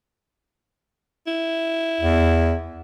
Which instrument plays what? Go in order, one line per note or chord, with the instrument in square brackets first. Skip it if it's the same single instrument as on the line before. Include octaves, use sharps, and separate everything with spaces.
[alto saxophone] E4
[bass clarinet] E2